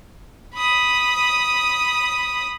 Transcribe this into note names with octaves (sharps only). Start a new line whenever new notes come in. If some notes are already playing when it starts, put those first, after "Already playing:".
B5 D#6